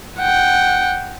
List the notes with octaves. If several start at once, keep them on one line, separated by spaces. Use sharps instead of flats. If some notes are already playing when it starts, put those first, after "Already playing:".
F#5 G5